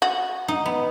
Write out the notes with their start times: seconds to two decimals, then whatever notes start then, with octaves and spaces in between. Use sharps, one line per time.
0.02 F#4
0.48 D#4
0.66 B3